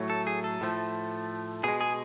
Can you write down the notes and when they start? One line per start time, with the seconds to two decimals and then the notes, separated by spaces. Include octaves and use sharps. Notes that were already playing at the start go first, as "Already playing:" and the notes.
Already playing: A2 F#3 A3
0.10 A4
0.27 G#4
0.44 A4
0.61 A2 F3 A3
1.64 B2 G#3 G#4
1.81 G#4